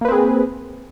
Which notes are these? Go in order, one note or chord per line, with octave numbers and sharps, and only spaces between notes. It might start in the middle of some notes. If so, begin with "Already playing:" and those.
A#3 C4 G#4 B4